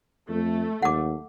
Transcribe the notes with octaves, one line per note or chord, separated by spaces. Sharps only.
F2 A3
D#2 F#5 D6